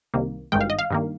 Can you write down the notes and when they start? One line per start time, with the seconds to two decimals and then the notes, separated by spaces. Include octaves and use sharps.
0.14 C2 C3 D#3 A#3
0.52 G#1 G2 D#3 G#3 G5
0.61 F5
0.70 D#5
0.79 F5
0.90 G2 D#3 A#3